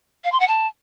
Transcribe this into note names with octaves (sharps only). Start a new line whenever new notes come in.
F5
C6
F#5
A5